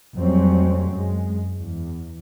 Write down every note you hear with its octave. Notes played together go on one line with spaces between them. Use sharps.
F2 F#3 G3 A3 C4 C#4
F#2 G#3
E2